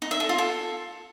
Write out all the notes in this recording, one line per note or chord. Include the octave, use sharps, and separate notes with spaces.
D#4
E5
A4
F4
A4